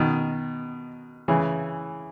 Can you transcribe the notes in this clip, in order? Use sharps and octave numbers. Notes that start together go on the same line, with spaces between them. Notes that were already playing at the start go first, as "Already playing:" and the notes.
Already playing: B2 D#3
C#3 E3